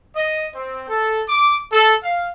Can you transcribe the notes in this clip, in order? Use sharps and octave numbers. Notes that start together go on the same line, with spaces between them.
D#5
C4
A4
D6
A4
F5